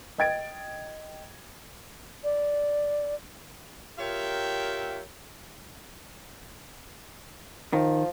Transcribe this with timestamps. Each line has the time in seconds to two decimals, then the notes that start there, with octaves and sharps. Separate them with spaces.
0.18 D#5 G5 G#6 A6 D7
2.24 D5
3.99 F4 G4 A#4 C#5 E5 G5
7.73 D#3 F3